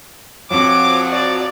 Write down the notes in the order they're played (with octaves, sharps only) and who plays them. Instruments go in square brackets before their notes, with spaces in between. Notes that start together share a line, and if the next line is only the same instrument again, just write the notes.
[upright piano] F2 C4 [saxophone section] F3 F#3 [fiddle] D6
[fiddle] F#4 D5